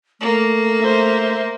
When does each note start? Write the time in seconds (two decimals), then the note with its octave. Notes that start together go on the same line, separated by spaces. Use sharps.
0.20 A3 A#3
0.80 C5 E5